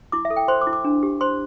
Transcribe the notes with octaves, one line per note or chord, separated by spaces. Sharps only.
E4 D6
E5
A4
G5
C5 C6
D6
E4
D6
D4
G4
C5 C6